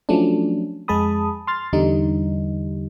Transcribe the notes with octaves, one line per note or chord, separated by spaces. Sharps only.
F3 F#3 A3 C#4 D4
F2 G#3 G#4 A5 B5 D#6
C6 F6 A6
E2 D3 G3 D#4